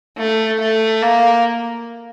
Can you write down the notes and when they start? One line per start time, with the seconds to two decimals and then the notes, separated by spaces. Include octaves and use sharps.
0.17 A3
0.60 A3
1.02 A#3